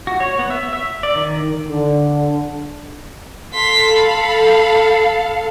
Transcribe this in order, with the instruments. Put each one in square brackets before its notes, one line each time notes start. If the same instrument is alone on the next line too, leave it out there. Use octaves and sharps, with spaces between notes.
[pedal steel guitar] F#4
C#5
B3
E5
E5
D5
D#3
[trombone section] D3
[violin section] A4 F5 [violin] C6 B6
[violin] B5